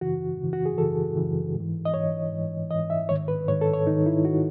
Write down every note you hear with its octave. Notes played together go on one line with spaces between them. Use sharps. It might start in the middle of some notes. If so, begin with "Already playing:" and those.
F#2 C#3 E3 F#4
F#2 C#3 E3
F#4
G#4
F#2 C#3 E3 A4
F#2 C#3 E3
G#2
E3
D#5
G#2 E3 C#5
G#2 E3
G#2 E3 D#5
E5
G#2 D#3 C#5
B4
G#2 D#3 C#5
A4
C#5
G#2 D#3 D#4
E4
G#2 D#3 F#4